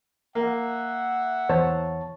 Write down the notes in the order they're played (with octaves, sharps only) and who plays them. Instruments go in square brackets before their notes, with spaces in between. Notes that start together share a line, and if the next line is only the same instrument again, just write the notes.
[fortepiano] A#3 [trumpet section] E5 F#5
[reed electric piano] E2 C#5 A5 [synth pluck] C5